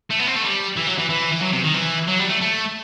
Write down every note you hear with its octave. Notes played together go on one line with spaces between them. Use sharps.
A3
B3
C4
A3
G3
E3
F#3
E3
E3
E3
F#3
C3
D#3
E3
F#3
G3
A3
A3